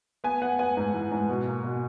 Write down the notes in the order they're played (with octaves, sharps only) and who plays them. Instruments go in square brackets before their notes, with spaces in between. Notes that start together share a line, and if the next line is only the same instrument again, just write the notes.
[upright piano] B3 G#5
B3 F#5
B3 G#5
G#2
E3
G#2
B2
A#3
B2